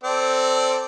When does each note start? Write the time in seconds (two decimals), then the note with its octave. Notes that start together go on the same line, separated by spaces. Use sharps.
0.04 C4 A4 D5